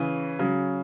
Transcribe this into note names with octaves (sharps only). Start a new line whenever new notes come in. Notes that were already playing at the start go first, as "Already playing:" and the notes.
Already playing: C#3 E3
C#3 F#3